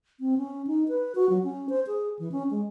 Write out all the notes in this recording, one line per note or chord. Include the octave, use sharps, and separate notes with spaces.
C4
C#4
D#4
B4
F#4
F#3
C#4
C5
G#4
E3
C#4
G#3